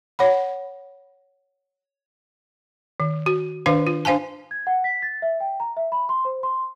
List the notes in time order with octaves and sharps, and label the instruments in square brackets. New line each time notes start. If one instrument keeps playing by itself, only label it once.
[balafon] C#5 F#5 B5
D#3
F#4
D#3 D4 B4 C5 F5
F4
D4 C5 F5 G#5 A5
[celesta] G#6
F#5
B6
A6
E5
G5
A#5
E5
B5
C6
C5
C6